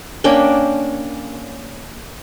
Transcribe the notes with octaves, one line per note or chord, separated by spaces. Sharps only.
A#3 C#4 D4 G5